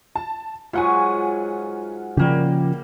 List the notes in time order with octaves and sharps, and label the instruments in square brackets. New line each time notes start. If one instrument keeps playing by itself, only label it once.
[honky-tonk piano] A5
[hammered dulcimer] G#2 F#3 [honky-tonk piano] F4 F#5 G#5
[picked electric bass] C#3 F3 [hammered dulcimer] G3 A#3 G4